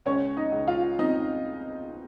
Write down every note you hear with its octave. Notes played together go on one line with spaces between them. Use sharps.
C#2 C#4 C#5
D#4 D#5
C#2
F4 F5
C4 D#4 D#5